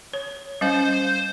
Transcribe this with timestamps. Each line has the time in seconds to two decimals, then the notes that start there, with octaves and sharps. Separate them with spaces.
0.13 C#5
0.61 G3 C#4 C5 F5